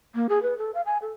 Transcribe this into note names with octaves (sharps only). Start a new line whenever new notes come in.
A#3
G#4
B4
A4
F5
G#5
A4